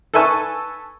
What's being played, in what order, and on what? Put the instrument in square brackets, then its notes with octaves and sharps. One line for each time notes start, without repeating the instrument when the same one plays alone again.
[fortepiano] A4 B4 E5 G#5 C#6 E6